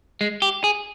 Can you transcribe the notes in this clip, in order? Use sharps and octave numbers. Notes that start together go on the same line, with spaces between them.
G#3
G4
G#4